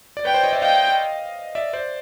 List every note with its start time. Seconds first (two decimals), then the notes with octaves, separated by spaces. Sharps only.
0.17 D5
0.25 B4 C#5 G5
0.34 C5 D5
0.43 C#5 D#5
0.53 D5 E5
0.62 D#5 F5 G5
1.55 D5 E5
1.73 C5 D5